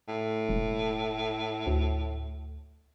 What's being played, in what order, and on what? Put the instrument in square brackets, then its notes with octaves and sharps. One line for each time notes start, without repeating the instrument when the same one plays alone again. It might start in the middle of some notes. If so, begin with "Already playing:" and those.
[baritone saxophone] A2
[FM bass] E1
D2